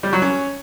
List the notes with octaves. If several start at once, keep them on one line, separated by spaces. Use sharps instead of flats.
G3
F#3
C#4